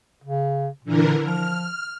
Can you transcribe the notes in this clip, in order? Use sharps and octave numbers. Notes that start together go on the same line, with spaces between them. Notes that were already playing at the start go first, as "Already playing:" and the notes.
C#3
A#2 D3 E3 A#4
F3 F6